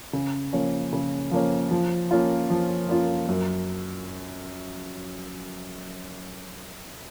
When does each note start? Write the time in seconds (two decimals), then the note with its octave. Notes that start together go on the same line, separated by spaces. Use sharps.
0.13 C#3
0.53 F3 A#3 C#4
0.93 C#3
1.31 F3 A#3 C#4
1.71 F3
2.11 A#3 C#4 F4
2.50 F3
2.88 A#3 C#4 F4
3.28 F#2